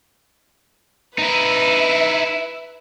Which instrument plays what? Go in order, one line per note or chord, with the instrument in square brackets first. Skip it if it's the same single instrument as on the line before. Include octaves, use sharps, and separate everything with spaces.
[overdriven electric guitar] D#4 E4 [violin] B4 E5